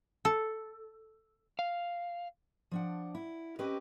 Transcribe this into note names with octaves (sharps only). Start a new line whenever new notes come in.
A4
F5
F3 D4 F#5
E4
C4 C#4 G4 A#4 B4 D#5